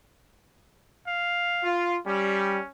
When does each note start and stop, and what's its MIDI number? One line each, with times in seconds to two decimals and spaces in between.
1.07 1.79 77
1.64 1.97 65
2.06 2.58 55
2.06 2.69 61